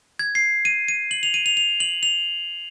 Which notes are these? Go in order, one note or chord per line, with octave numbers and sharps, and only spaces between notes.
G#6
C7
D#7
D#7
F#7
F7
D#7
F7
F7
F#7
F7